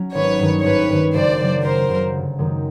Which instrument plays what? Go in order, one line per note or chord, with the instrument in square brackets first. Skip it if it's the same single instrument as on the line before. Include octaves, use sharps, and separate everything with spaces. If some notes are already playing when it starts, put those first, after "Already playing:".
Already playing: [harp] F#3 C#4
[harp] G#1 [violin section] B4 C#5
[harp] G2 D#3
[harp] G#1 [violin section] B4 C#5
[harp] G2
D#3
[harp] F#1 [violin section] C5 D5
[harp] F#2 C#3 F#3
[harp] F#1 [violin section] A#4 C5
[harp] F#2 C#3 F#3
G1
F#2 D#3 G#3